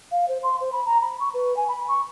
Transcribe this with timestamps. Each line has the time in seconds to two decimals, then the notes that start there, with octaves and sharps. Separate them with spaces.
0.12 F5
0.28 C5
0.43 C6
0.60 C5
0.72 B5
0.86 A#5
1.01 B5
1.20 C#6
1.34 B4
1.57 G#5
1.68 B5
1.88 C#6